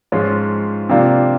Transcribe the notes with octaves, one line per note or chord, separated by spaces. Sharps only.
G#2 F3 G#3 C#4 F4
C3 F3 A#3 D4 F4